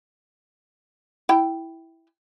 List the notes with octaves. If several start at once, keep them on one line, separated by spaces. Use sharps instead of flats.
E4 G5